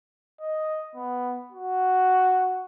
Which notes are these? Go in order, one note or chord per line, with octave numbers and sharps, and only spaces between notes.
D#5
B3
F#4